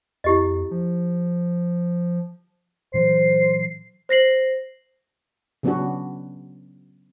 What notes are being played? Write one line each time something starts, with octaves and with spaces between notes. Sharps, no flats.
F2 E4 G4 D#5
F3
A#2 E3 F#3 C5 C7
C5 A#6 C7 F#7
C#3 F#3 B3 C#4 D4 F#4